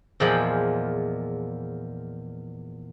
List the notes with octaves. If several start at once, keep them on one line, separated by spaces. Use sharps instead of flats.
E2 A#2 F3 G#3 G5 B5